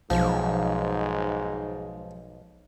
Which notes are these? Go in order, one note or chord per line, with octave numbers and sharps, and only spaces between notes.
B1 G#2 F3